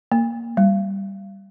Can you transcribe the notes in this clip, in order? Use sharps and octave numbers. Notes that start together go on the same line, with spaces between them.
A#3
G3